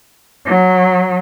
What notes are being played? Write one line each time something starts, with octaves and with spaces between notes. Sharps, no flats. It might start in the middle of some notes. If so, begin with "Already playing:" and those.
F#3